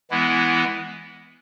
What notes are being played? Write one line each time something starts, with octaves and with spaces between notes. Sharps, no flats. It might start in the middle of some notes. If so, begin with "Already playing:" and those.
E3 G#3 B3 E4